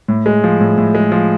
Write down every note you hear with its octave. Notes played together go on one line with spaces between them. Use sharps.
A2
G#3
F3
A2
A2
G#3
F3